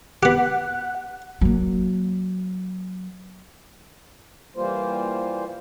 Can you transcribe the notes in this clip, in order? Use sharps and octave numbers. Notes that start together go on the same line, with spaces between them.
B3 G4 F#5
F#3 A#3
E3 G3 A#3 F4 C5